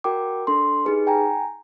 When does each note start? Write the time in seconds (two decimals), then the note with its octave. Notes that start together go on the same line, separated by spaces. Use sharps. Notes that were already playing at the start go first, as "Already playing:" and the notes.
0.04 F#4 A#4 G5 D6
0.47 D4 A4 C6
0.85 D#4 G4 G#4 B4
1.07 G5 G#5 A#5